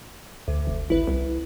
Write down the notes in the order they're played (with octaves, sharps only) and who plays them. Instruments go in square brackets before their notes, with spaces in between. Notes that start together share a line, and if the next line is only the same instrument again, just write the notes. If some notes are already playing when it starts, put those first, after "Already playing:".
[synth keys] D2
[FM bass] F1
[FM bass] G#1 [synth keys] E4 B4
[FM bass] C2